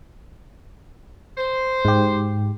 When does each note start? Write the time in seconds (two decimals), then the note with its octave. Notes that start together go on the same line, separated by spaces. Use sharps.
1.38 C5
1.85 G#2 G4